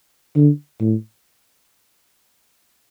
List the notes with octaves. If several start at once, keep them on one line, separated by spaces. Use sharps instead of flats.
D3
A2